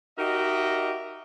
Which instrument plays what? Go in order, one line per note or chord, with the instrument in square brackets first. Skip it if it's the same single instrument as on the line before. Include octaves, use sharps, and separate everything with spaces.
[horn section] D#4 F#4 G4 A#4 D#5 E5